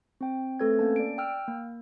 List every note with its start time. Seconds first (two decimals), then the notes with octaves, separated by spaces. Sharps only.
0.21 C4 G5
0.60 A3 C4 A4 B4 G#6
0.79 A#3 C#4 A5
0.96 D5 D7
1.18 G5 E6 F6
1.48 A#3